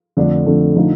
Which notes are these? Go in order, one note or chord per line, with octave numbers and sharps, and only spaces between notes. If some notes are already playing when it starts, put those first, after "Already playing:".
F2 D3 A3 D4
F2 D3 A3 D4
D3 F3 A3 D#4